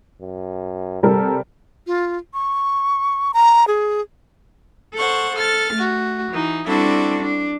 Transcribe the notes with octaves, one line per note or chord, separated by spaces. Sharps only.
F#2
C3 G3 A4 A#4
F4
C#6
A#5
G#4
A4 C5 F#5 C#6
A4 F6 A6
A3 F#4
E3 D#4
G3 C4 D4 E4 F#4 A4
D4